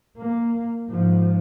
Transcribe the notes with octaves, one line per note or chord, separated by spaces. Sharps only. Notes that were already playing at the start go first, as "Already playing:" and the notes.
A#3
G#2 F3